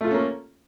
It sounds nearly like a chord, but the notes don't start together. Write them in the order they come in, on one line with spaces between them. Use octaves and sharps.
A3 F4 A4 C#4 A#3